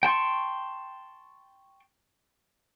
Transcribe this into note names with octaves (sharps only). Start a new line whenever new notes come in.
G5 A5 C6 C#6